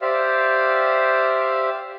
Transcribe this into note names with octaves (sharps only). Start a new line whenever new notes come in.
G4 C5 D5 E5 F5